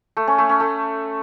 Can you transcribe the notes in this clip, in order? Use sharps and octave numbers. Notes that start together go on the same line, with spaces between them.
A3
C#4
A3
C#4
A3